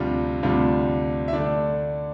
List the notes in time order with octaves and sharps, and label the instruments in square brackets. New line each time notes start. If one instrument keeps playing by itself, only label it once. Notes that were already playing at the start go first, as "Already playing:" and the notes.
Already playing: [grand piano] D2 C3 G3 D4 F4
D2 C3 G3 D4 F4
E5
D3 A3 D4 D5